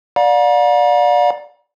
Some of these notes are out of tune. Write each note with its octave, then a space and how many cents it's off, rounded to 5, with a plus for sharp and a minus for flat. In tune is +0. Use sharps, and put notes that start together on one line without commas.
D5 +0 F5 +45 A#5 +40